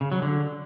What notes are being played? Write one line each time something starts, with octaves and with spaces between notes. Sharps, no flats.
C#3
F#3
D3